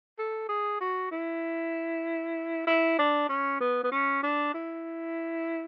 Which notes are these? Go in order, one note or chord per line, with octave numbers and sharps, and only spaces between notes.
A4
G#4
F#4
E4
E4
D4
C#4
B3
B3
C#4
D4
E4